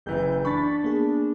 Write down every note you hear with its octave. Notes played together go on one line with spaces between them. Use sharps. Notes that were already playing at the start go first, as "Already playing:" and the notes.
F#1 E3 G6
D4 B5 C#6 A6 B6
A#3 B3 G#4